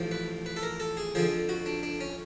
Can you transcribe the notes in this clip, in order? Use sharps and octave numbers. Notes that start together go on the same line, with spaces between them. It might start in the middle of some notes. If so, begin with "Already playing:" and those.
Already playing: A1 A2 F3
B4
B4
A4
A#4
A4
G#4
F2 D3 F3 G#4
F#4
D4
D4
C#4